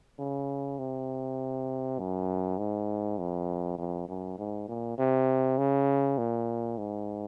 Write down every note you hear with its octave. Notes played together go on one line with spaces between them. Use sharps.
C#3
C3
F#2
G#2
F2
F2
F#2
G#2
A#2
C3
C#3
A#2
G#2